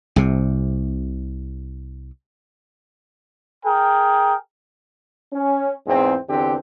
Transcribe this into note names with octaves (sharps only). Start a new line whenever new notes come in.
C2 C3
G#4 A#4 G5
C#4
E2 G#2 C4
E2 D3 C4 G4